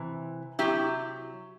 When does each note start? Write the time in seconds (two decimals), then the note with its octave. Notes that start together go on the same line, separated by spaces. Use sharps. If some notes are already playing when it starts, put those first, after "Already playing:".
Already playing: C3 E3
0.59 C3 F#3 E4 G4